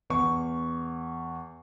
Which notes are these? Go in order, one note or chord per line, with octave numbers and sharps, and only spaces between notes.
E2 C#6